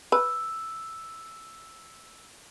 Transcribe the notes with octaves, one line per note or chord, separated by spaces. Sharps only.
B4 E6